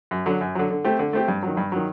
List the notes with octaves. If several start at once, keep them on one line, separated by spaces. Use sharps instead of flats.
F#2
D3 F#3
F#2
D3 F#3
D3
A3 C4 G4
D3
A3 C4 G4
G2
D#3 F#3
G2
D#3 F#3